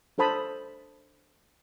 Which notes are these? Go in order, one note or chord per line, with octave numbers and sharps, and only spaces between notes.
D4 A4 C5 A5 B5 D#6